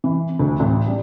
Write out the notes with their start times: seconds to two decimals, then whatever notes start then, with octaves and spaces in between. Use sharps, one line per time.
0.04 E3
0.39 D2
0.60 A1
0.87 G3